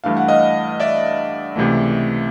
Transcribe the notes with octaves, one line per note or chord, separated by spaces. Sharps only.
G2 E3 A3 D4 F5
F#5
D#5 F5
D5 E5
C#2 C3 E3 A3